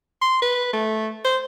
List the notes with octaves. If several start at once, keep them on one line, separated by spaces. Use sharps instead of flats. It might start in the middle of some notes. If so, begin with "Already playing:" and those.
C6
B4
A3
C5